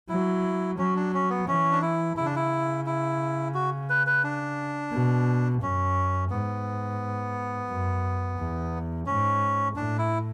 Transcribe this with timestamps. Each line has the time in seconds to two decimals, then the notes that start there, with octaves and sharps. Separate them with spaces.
0.09 F#3 E4
0.78 F#3 C#4
0.96 D4
1.14 C#4
1.30 B3
1.47 E3 C#4
1.72 D4
1.82 E4
2.17 C#3 E4
2.26 D4
2.36 E4
2.86 E4
3.54 F#4
3.90 B4
4.07 B4
4.24 D4
4.93 B2
5.62 F#2 C#4
6.30 G#2 B3
7.69 F#2
8.38 E2
9.06 G#2 C#4
9.76 A2 D4
9.99 E4